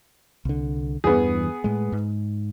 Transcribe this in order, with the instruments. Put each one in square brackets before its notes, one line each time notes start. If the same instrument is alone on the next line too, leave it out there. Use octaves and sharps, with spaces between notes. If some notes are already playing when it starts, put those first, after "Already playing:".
[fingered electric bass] C2 D3
[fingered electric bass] E2 G2 E3 [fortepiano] B3 G#4
[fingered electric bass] A2 G#3
G#2